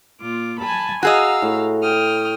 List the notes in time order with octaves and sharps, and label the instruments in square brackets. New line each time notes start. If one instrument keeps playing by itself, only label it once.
[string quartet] A#2 F4 D6
G#5 A5 B5
[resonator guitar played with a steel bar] F#4 G#4 D#5 [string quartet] F5 A#5 E6
[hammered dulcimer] A2
[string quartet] G5 D#6 F6